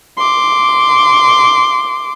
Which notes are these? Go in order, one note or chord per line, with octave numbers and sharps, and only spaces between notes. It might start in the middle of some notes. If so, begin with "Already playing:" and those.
C6 D6